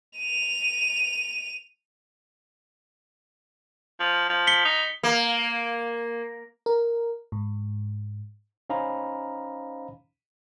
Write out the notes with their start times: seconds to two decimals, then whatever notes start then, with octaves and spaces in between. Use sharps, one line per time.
0.18 D#7 F7
4.00 F3
4.29 F3
4.47 B6 C#7 G7
4.65 D#4
5.03 A#3
6.66 A#4
7.32 G#2
8.70 C#4 D#4 C5 F5 A#5 B5